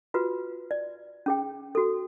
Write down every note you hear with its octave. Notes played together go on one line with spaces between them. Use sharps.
F4 F#4 B4
D5
C#4 G#4 G5
F#4 A4